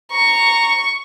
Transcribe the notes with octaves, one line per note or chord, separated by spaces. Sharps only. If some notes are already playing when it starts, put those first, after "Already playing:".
A#5 C#6